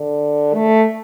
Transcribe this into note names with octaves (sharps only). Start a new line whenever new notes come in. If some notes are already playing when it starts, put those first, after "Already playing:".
Already playing: D3
A3